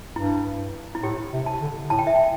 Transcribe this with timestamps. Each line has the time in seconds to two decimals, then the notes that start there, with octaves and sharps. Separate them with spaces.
0.16 G2 E4
0.95 E4
1.03 A2 G4
1.33 C3
1.46 A5
1.61 D3
1.90 A2 A5
1.99 G5
2.07 E5
2.15 G5